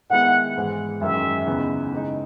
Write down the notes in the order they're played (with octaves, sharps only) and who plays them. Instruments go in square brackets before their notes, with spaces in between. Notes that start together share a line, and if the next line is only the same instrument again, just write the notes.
[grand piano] D#3 G#3 B3 E4 [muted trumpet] F#5
[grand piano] G#2 E3 G#3
[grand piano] F#2 D#3 G#3 [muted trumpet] E5
[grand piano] E2 C#3 E3 B3 D#4
C#3 G#3 D#4